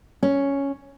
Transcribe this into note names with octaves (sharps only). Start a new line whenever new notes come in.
C#4